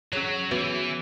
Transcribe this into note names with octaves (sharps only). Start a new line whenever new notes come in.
F#3 C#4 G#4 C#5
E3 B3 F#4 B4